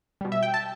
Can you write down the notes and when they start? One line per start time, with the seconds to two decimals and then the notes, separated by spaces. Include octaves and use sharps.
0.21 B2 G3
0.32 E5
0.43 G5
0.54 A5